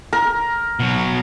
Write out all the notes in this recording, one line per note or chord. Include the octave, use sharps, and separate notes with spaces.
A#4
B2 F#3